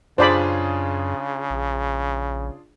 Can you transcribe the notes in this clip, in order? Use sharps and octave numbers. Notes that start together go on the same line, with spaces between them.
F#2 C#3 D4 F4 G#4 C5 D5 B5
A#1